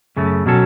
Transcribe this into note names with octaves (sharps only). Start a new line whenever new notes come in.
F#2 C#3 A3
B2 F#3 C#4 A4